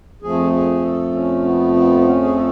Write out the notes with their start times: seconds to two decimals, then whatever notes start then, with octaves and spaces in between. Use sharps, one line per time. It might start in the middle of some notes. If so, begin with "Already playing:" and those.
0.22 F2 F3 A3 G#4
0.52 G#4
0.83 A4
1.13 C#4
1.43 B3
1.74 B3
2.00 B3
2.04 C#4
2.22 G#4
2.34 A4